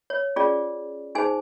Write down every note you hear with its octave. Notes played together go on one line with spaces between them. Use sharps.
C#5
C#4 F4 G#4 D5
D#4 G#4 C5 G#5